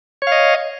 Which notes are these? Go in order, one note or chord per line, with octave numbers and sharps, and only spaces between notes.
C#5 D#5 F5